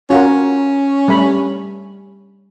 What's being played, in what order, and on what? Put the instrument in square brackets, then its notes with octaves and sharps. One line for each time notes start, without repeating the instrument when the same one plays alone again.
[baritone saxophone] C#4 [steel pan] F4 F#4 A#4
[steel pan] G3 A3 B5